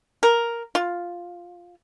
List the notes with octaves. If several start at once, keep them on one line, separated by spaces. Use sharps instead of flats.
A#4
F4